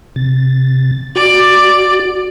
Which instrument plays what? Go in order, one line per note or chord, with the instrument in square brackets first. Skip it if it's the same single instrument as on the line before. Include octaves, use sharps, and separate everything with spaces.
[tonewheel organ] C3 A6
[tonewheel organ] F#4 [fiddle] D5